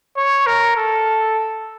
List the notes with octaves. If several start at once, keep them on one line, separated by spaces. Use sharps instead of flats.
C#5
A#4
A4